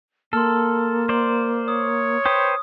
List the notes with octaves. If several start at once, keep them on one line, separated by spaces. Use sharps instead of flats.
A#3 A4 C6 F6
C5 D5
C#5 D#6
B4 C5 G5 D#6